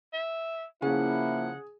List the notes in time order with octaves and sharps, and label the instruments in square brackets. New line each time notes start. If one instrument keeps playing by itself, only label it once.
[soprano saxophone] E5
[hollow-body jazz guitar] C#3 [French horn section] F3 A#3 E4 [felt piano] G#4 [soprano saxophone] F#5